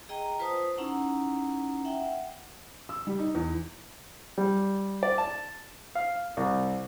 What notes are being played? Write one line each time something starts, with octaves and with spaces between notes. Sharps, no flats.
G#4 D#5 G5 A#5
F4 B4 C5 A5 D#6
C#4 D#4 E4 F#5 A#5
E5 F#5 G5
E6
G3
D#4
E2
G3
D5
A5
F5
C2